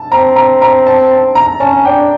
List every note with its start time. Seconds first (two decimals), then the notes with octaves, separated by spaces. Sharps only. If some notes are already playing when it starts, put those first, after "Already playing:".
Already playing: A5
0.12 C4 A#5
0.36 A#5
0.62 A#5
0.87 A5
1.11 A5
1.35 A#5
1.60 C#4 A5
1.85 D4 G5